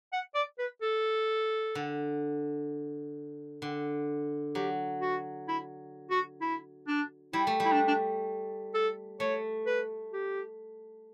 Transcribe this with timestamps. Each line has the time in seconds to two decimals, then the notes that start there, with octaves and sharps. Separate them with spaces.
0.13 F#5
0.35 D5
0.59 B4
0.82 A4
1.75 D3
3.62 D3
4.54 F#3 G4
5.02 F#4
5.48 E4
6.10 F#4
6.41 E4
6.87 D4
7.33 G3 E4
7.47 A3
7.60 G3
7.65 E4
7.73 D4
7.87 D4
8.74 A4
9.20 A3 C#5
9.66 B4
10.13 G4